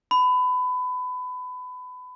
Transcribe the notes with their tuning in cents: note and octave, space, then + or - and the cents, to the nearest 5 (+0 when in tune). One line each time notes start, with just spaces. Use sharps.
B5 +25